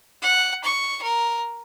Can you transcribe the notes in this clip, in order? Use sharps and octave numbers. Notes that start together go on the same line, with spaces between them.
F#5
C#6
A#4